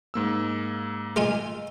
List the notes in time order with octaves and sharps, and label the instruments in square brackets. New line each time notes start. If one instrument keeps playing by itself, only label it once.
[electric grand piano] G#2 A#3 E6
[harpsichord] G#3 F4 G#5